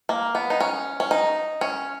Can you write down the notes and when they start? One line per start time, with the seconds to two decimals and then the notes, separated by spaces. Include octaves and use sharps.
0.09 A#3
0.35 B3
0.50 D#4
0.60 C#4
1.00 C#4
1.11 D#4
1.61 C#4